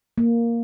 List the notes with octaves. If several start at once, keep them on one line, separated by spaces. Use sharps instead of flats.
A#3